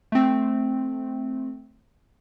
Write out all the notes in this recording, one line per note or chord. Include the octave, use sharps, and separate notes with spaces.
A3 C4